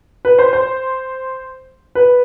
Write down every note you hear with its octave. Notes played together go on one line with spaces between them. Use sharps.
B4
C5
C5
B4